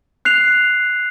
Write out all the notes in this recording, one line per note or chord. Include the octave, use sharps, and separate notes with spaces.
F#6 C7 F7